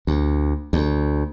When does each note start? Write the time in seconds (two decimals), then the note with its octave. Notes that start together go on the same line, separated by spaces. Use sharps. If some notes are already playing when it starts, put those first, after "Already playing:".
0.07 D2
0.73 D2